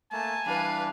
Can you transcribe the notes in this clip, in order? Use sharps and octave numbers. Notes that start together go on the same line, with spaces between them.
A3 A#3 G#5 A5
E3 G3 D4 B4 F5